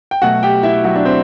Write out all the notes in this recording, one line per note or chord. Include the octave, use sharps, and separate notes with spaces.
G5
B2 F#3 A3 F#4 F#5
G4 G5
E4 E5
F#3 F#4
D4
C4